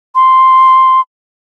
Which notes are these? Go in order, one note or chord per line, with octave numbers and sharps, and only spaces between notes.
C6